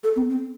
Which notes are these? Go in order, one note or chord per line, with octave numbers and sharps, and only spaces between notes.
A4
C4
C4